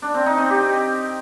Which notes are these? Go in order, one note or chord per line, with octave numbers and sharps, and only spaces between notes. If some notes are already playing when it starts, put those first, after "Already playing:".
D4
C4
D#4
C4
G4